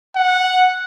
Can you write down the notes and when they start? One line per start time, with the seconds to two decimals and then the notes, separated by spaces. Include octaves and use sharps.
0.15 F#5